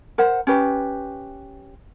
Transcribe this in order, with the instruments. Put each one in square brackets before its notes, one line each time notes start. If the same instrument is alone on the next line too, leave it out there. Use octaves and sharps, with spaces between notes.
[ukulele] A#4 C5 F#5
C#4 G4 B4